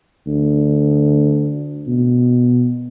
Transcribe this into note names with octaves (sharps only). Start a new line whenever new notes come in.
D2
B2